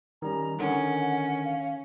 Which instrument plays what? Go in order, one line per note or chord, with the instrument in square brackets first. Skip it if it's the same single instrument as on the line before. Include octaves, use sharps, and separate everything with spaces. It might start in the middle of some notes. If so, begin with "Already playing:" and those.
[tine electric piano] D#3 G3 C#4 [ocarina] A#5
[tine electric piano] D3 D#3 [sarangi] C#4 [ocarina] F#5
[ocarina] F5